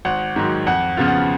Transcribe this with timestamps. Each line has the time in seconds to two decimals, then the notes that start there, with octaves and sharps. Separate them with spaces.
0.05 G#1 F#5
0.36 G#2 D#3 F#3
0.67 F2 F#5
0.97 C#3 F3 B3 F4
1.08 F#5